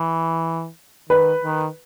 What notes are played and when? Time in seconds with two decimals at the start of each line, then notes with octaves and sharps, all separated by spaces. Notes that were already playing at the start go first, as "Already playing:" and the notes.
Already playing: E3
1.09 D#3 B4
1.44 D#3